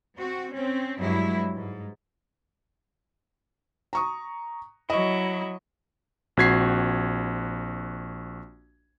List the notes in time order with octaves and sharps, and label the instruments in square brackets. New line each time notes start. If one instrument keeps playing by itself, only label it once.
[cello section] C4 F#4
C4 C#4
G2 F#3 G#3 E4
G#2
[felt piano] A#5 C#6 D#6
[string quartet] F#3 E4 [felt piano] D#5 C#6
[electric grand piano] A#1 C4 F#4 G#6 B6 C7